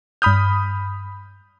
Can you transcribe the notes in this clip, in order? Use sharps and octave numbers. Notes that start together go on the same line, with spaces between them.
G2 B5 D#6 F6 G6